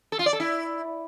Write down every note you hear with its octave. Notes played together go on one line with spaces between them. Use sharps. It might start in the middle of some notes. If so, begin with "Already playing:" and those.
A4
F4
D5
A4
E4